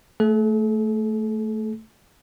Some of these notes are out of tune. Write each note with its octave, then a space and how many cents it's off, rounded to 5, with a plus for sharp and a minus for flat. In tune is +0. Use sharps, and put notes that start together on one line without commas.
A3 +0 A4 -45